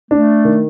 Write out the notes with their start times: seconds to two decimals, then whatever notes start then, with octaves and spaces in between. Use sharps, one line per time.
0.11 A3 D4
0.45 D#3